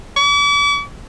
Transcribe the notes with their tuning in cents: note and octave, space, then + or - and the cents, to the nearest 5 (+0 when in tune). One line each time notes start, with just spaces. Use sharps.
D6 -45